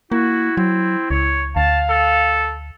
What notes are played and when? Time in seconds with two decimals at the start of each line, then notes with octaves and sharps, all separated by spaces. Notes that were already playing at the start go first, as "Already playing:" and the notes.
0.12 A#3 E4 F#4
0.57 F#3 C4
1.11 C#2 C#5
1.56 D2 F5 A5
1.90 A4